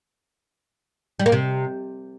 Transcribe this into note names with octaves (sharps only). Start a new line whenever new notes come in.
G3
A#3
C3